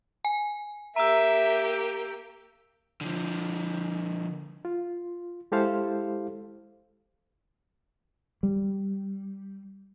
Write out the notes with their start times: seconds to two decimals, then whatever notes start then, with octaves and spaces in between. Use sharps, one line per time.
0.25 G#5
0.96 A#3 G4 E5 A#5 E6
3.01 D3 F3
4.65 F4
5.52 G#3 E4 G4 A4 C5 F5
8.43 G3